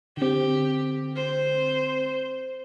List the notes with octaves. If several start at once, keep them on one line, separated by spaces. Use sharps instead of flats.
D3 C4 G4
C5